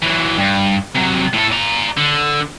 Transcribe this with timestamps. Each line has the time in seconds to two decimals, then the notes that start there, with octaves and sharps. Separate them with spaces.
0.02 E3 F#3
0.38 G2
0.95 C3 F#3
1.34 A2 A4
1.52 D5 A#5
1.97 D3